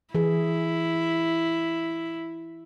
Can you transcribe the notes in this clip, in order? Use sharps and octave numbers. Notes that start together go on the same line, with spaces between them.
E3 E4 G#4